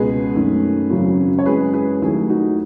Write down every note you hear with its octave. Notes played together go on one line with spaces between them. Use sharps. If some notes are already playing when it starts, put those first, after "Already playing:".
Already playing: C#2 B2 G#3 B3 G#4 B4
F#2 D#3 A3
G#1 F#2 C#3 F#3
C#5
F#2 E3 G#3 G#4 B4
G#4 B4
D#2 D#3 F#3 A3 E4 G#4
D#4 F#4